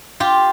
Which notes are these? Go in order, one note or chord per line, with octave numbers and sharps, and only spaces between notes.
F4 G4